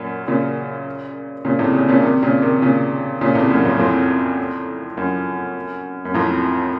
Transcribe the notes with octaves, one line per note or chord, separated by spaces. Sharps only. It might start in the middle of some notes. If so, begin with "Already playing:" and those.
Already playing: F#2 A#2
A#2 C#3
A#2 C#3
A2 C3
A#2 C#3
A#2 C#3
C3 D#3
A#2 C#3
C3 D#3
A#2 C#3
A#2 C#3
A2 C3
F#2 A#2
F2 A2
F2 A2
F#2
F#2
F2 A2